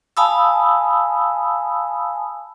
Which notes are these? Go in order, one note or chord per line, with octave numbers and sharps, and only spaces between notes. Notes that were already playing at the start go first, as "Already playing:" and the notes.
F5 G#5 A5 B5 D#6 E6